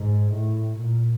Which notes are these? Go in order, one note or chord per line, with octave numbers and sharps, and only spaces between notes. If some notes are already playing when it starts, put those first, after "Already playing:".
Already playing: G#2
A2
A#2